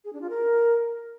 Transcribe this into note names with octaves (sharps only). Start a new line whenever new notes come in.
G#4
D4
F4
A#4